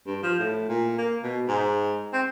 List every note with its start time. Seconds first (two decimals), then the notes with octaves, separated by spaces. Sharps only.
0.06 G2
0.23 F3
0.39 A2
0.68 A#2
0.98 A#3
1.23 B2
1.48 G#2
2.13 C4